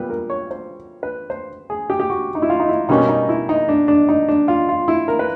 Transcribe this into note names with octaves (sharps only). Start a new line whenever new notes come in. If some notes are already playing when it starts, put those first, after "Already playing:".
Already playing: A#2 G3 B3 B4
A#4
C#5
C5
B4
C5
G#4
G4
G4
F#4
D#4
E4
F4
D#4
E4
B2 G3 A#3 C#4 D#4
D#4
E4
D#4
D4
D4
D#4
D4
F4
F4
E4
A#4
B4